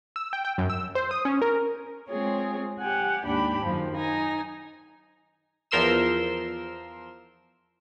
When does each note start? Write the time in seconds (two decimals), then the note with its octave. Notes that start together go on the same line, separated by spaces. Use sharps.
0.16 E6
0.33 G5
0.45 G5
0.58 F#2
0.70 E6
0.95 C5
1.11 D#6
1.25 C#4
1.42 A#4
2.09 G#3 C4 F4 G#4 C#5
2.79 G4 F#5 G#5
3.24 D#2 G#2 D4 G4 B5
3.63 F#2 D#3 F3
3.96 D#4 G#5 A#6
5.71 E2 F3 A#4 C6 E6 E7